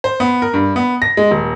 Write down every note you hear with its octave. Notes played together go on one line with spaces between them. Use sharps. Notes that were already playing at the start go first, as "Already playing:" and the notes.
C5
B3
A#4
G2
B3
A#6
G#3
D#1